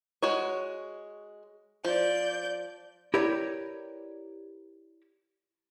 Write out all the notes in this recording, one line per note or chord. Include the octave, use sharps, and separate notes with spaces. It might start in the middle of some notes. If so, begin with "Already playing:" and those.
G#3 F#4 C#5
F3 D5 G6
E4 G4 A#4 B4 C#5 D5